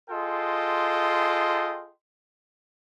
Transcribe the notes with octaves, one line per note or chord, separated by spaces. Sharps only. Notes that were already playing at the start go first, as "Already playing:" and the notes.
F4 G#4 A4 D#5 G5 C6